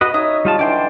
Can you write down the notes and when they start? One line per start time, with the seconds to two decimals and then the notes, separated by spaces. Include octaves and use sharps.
0.01 F#4 B4 D#5
0.14 D#4 C#5 D#5 E5 D#6
0.45 G3 F4 A5
0.59 D3 E3 D5 G5 C6